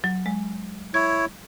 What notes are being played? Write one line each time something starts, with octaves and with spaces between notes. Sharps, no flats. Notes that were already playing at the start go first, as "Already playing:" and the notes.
F#3
G#3
E4 C#5 G#6